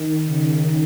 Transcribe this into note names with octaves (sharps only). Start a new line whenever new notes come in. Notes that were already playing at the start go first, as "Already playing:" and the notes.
Already playing: D#3
C#3